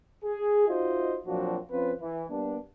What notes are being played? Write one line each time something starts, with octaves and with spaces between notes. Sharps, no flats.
G#4
D#4 F4 F#4 C5 D#5 E5
A#2 F3 F#3 C4 D4 F#4
F3 C4 C#4 F4 B4
E3
G3 A#3 B3 D4